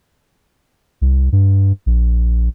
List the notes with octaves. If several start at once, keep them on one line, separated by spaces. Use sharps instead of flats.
C2
G2
A#1